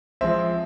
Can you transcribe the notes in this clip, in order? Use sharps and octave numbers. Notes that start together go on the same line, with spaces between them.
F3 G#3 C4 E5